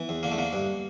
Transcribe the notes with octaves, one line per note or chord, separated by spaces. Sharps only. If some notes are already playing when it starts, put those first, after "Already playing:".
Already playing: E3 B3
E2
D3 A#3
A3
D3 A#3
G2